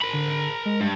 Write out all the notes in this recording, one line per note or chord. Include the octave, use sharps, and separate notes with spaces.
A#4 B5
D3
G#3
G2